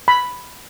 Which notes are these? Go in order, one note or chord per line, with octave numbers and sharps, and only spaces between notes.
B5